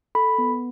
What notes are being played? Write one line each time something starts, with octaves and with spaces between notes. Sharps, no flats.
A4 B5
B3